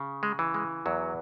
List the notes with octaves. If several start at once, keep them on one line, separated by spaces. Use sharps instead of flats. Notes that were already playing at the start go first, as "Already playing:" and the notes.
Already playing: C#3
G#3
E3
G#3
E2 F#3